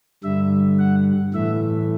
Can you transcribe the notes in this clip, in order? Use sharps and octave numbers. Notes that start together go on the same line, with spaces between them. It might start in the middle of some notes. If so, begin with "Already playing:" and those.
G2 D3 G3 E5
F#5
A2 E3 A3 E5